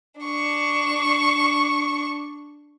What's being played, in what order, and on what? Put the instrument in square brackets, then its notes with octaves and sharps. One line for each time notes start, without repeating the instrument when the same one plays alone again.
[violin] D4 C#6